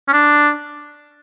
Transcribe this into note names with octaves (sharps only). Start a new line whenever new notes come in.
C#4
D4